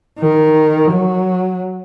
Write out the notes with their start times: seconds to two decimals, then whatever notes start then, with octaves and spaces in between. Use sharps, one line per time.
0.20 D#3
0.93 F#3